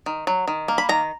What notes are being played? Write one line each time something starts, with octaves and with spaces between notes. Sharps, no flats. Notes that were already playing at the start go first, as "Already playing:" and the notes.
D#3
F#3
D#3
A#3
B5
D#3 A#5